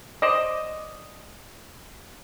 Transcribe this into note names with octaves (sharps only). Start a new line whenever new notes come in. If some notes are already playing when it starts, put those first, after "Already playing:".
C5 D5 D#5